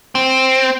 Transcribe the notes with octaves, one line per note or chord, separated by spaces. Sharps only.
C4